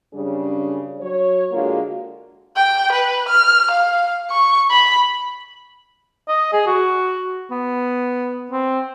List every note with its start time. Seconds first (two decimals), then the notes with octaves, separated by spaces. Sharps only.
0.14 F#2 C#3 G3 D4 G#4
1.00 F#3 C#5
1.52 D3 G#3 A#3 F4 F#4
2.56 G5
2.93 B4
3.29 F6
3.71 F5
4.30 C#6
4.71 B5
6.28 D#5
6.53 G#4
6.67 F#4
7.51 B3
8.51 C4